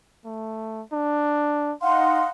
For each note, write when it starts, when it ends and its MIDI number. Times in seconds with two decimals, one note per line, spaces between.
0.25 0.82 57
0.92 1.73 62
1.82 2.29 63
1.82 2.30 77
1.82 2.29 78
1.82 2.29 84